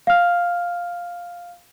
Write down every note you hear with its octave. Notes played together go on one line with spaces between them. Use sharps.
F5 F6